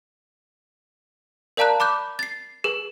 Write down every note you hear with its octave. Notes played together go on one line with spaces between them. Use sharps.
A#4 D5 F5 A5 A#5 F#6
B5 D6 F#6 G6
A6 C7
G#4 B4